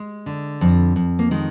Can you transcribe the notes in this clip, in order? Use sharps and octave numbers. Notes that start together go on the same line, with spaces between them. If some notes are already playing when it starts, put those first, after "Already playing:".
Already playing: G#3
D3
F2
F2
A#3
D#3 G#3